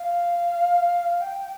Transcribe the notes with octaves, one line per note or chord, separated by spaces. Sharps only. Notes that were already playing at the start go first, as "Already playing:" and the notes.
Already playing: F5
G5